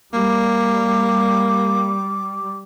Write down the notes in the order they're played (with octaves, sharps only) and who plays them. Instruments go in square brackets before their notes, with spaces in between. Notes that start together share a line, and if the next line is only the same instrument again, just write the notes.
[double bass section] G3 [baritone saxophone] A#3 [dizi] D6